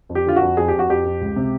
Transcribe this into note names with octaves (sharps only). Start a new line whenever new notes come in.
F2
G4
D3 F4
F#4
F2
F2 G#4
F2 G4
F#4
F2 G4
F2
C#2
C3